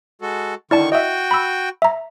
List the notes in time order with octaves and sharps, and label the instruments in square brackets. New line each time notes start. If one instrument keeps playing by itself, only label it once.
[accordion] G#3 F#4 A4
[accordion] D3 D#3 C#6 [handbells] E4 D5 A5
[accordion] F#4 G5 [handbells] D#5 E5
[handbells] B5 E6
E5 A#5